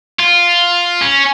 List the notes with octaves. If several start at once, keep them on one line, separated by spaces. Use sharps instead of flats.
F4
C#4